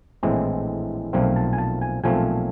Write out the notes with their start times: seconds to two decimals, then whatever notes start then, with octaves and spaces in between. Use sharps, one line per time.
0.23 A#1 A2 E3 G#3 C4
1.13 B1 A#2 F3 A3 C4
1.36 A5
1.53 G#5
1.58 A5
1.81 G#5
2.04 B1 A#2 F3 A3 C4 G#5